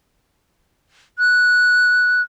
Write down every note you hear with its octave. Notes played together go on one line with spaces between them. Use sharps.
F#6